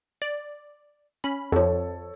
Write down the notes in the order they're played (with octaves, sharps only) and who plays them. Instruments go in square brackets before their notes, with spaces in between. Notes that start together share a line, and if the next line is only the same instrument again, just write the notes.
[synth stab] D5
C#4 B5
[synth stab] F2 F3 [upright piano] A4 C#5